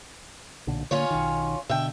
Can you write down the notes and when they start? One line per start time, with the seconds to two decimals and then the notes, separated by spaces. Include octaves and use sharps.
0.67 B1 A#2 D3
0.91 D3 A#3 C#4 F4 C#5
1.11 B1 D#3
1.69 B2 D3 E5 G5